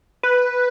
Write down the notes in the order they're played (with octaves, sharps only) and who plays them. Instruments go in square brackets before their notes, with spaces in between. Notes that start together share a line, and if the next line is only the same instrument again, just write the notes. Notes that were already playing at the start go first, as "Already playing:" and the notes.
[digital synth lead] B4